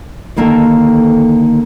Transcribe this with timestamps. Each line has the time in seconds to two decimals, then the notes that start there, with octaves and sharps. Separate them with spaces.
0.36 D3 D#3 A#3 A4 G#5 A5